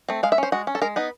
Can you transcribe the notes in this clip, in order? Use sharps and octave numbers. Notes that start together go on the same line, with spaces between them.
A3 C4
G#3 F5
E5
C#4 C5
G#3 F#4
C#4
A4
G#3 A#4
B3 D#4 B4